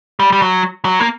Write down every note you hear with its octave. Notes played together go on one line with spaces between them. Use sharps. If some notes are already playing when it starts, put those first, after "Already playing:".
G3
G3
F#3
F#3
A#3